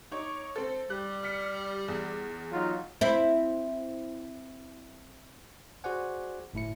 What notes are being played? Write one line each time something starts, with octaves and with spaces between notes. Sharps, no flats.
D#4 C#5 D6
C4 A4 C5
G3 G4 F#6
F6 B6 C#7
E2 G#4
F#3 D#4 F4
C4 E4
F#4 G#4 C5 D5 F#5 G#5
G1 A2 E4 C#7